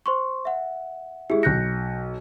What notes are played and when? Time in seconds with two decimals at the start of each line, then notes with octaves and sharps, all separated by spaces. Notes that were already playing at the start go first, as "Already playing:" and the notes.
0.06 C5 C6 C#6
0.45 E5 F#5
1.30 G#3 E4 G4 G#4
1.43 B1 F#6 G6 A#6 C#7